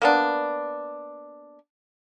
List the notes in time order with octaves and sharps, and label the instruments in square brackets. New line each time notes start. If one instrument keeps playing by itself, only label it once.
[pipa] A#3 B3 D4